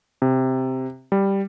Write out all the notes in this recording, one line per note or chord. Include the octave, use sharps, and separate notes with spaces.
C3
G3